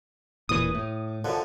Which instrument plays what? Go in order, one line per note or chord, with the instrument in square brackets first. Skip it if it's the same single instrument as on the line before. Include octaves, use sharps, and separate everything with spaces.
[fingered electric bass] E1 A#2 E3 [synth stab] D#6
[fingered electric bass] A2
[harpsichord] F#2 D3 F3